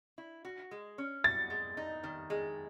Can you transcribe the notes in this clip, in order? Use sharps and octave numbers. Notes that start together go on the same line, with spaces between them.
E4
F#4
G#3
C#4
F#4 A6
G#3
D#4
D#3
G#3